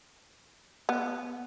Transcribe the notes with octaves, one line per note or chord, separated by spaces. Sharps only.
B3